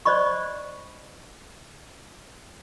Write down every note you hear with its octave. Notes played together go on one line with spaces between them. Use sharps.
C5 D5 D#5 B5 C#6